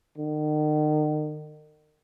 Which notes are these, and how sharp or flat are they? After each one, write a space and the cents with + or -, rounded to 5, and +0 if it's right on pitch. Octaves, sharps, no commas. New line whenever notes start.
D#3 -40